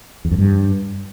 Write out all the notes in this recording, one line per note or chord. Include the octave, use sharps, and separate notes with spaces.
E2
F2
G2